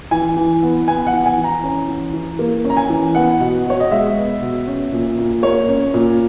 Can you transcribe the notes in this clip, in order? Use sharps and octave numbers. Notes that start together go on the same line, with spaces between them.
E3 G#5
E3
B3
B3 G#5
F#5
E3
G#5
E3
A#5
C#4
E3
E3
A#3
C#4
A#5
G#5
E3
B3 F#5
B2
B2 C#5
D#5
G#3 E5
B3
B2
C#4
A#2
A#2
A#3 C#5
C#4
A#2